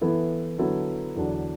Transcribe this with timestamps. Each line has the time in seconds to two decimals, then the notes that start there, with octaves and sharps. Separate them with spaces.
0.01 E3 B3 E4 A4
0.58 D3 F#3 B3 E4 A4
1.16 E2 D3 F#3 D4